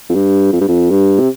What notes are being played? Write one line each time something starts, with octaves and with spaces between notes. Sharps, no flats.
F2
G2
F2
G2
F2
G2
C3